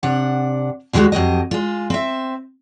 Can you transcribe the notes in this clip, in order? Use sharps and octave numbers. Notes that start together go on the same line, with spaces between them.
C3 D4 F#5
D#2 D#3 E3 G3 G#3 F#4
F2 F#3 G4 D#5
G#3 F4
C4 E5